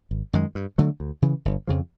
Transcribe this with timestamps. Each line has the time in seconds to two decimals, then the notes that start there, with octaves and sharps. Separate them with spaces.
0.11 G#1
0.33 F#2 D#3 G#3
0.55 G2
0.78 D3 F#3 A3
1.00 D2
1.22 C#3 E3
1.45 G1
1.67 F2 C#3 F3